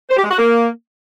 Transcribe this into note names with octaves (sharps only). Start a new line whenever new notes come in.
C5
G4
G#3
F#4
A#3